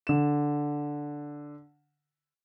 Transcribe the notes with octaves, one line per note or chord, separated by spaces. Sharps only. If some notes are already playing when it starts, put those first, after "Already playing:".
D3 E7